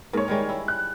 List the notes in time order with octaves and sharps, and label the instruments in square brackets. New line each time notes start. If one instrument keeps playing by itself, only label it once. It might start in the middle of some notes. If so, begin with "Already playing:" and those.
[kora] G#2 [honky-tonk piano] A#3 C#5
[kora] D#3 G3 G#3
E4
[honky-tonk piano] F#6